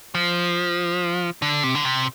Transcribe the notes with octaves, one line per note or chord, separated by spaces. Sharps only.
F3
D3
C3
D3
C3